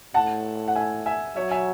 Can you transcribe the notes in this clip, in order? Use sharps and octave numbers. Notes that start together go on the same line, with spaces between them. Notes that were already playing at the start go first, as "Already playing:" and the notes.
A2 F#5 A5
F#5
E5 G#5
E5 G#5
F#3 C#5 E5
E5 G#5